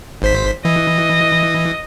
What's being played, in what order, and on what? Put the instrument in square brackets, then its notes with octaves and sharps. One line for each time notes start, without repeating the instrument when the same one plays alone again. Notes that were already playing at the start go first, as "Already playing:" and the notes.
[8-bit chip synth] G#1 C5 B6
[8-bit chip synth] E3 [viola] D#5